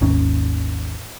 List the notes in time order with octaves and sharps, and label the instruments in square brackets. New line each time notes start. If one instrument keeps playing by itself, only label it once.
[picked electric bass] G#1 D#2 D#3 C#4